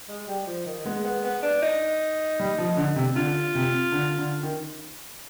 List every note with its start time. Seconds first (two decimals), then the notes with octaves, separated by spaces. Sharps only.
0.09 G#3
0.28 G3
0.47 F3
0.66 D#3
0.85 G#3 B3
1.05 B3
1.24 B3
1.43 D4
1.62 D#4
2.40 G3
2.58 F3
2.77 D3
2.96 C3
3.16 D3 F4
3.55 C3
3.92 D3
4.18 D3
4.43 D#3